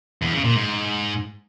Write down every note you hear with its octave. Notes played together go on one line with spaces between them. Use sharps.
E2
C#3
A#2
G#2